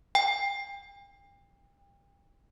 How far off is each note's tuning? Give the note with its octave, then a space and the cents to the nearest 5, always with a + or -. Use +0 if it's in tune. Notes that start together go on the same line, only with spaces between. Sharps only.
G5 +35